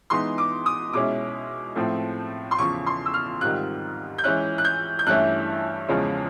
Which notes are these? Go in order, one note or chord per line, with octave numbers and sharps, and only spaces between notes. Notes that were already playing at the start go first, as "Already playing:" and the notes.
E3 G#3 B3 D#4 C6
D6
D#6
B2 G#3 C#4 E4 D6
A2 F3 A3 C4
C6
E2 C#3 F3 C#6
C6
E6
F6
G#2 D#3 G3 C4 F4 F#6
G6
E3 G#3 C#4 E4 F#6
F#6
G6
G6
G2 E3 A3 C#4 E4 F#6
E2 C#3 F3 G#3 C#4